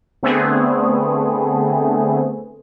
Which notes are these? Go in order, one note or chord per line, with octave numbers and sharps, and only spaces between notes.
D3 A3 B3 C4 G#4